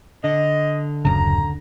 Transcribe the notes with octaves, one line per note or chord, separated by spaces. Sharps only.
D3 D#5
D1 F#2 C#3 A#5